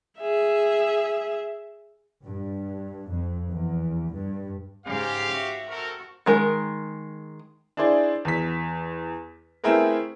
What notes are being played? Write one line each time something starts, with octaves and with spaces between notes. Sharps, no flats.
G#4 E5
G2
F2
E2
G2
G#2 C#3 G4 F5
F#4 E5
C4 F#4 A4 A#4
D#3 G#3 A#4
D4 E4 G#4 C5 D5
E2 B6
A3 C4 E4 G#4 A#4 B4